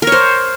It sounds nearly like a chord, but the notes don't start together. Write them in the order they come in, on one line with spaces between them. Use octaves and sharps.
A#4 C#5 C5